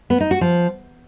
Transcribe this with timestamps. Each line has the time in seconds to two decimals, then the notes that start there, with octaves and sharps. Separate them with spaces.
0.10 B3
0.20 D#4
0.31 F#4
0.41 F3